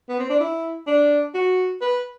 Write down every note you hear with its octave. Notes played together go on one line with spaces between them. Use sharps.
B3
C4
D4
E4
D4
F#4
B4